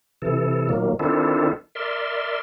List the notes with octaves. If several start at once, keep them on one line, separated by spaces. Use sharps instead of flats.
C3 E3 A4
A#2 D#3 F#3 A#3
D#3 C4 D4 E4 F4 A4
A#4 D5 E5 C6